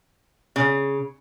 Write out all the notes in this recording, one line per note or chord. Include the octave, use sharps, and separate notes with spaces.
C#3